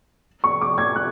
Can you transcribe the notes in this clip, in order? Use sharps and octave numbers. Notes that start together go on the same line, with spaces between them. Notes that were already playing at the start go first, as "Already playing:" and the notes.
C#6
D6
G#6
F#6